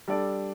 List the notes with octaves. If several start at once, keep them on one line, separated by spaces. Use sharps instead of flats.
G3 D4 A4 D5